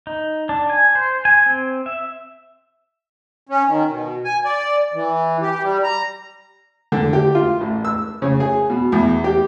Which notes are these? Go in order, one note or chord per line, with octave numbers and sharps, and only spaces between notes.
D#4
D4
G#5
C5
G#5
C4
E5
C#4
D#3
B2
G#5
D5
E3
G4
G3
A#5
D3
G4
F4
A1
E6
C#3
G#4
B2
E2
G4